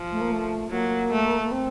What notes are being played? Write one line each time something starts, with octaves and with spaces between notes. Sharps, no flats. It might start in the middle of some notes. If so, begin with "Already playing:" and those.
Already playing: F3
A3
A#3
A3
F#3 A#3
A3
A#3
C4